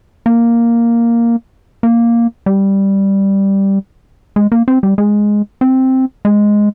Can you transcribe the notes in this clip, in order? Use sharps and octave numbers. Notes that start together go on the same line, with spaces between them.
A#3
A#3
G3
G#3
A#3
C4
G3
G#3
C4
G#3